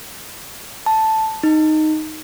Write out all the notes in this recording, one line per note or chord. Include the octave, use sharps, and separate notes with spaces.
A5
D#4